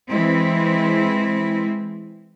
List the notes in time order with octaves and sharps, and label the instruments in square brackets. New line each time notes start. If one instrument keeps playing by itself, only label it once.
[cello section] E3 G#3 C4 E4